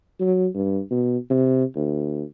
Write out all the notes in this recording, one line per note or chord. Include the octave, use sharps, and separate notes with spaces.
F#3
G2
B2
C3
D2